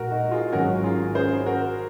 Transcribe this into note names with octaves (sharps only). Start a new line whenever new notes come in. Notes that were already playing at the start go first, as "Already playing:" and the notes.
Already playing: A#1 A#2 G#3 F#4 A#4
D#4 F#4
F4 G#4
G#1 G#2 D#3 F#3 C#4 F#4 A#4
F4 G#4
G#4 C5
F#4 A#4